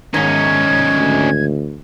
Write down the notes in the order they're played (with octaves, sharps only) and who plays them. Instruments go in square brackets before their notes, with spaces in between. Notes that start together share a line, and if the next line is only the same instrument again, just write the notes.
[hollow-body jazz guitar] G#2 D#3 [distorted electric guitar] C#4 D#4 [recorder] G#6
[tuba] D2